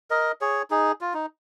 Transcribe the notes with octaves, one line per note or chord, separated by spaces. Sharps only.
A#4 D#5
G#4 C#5
D#4 G#4
F4
D#4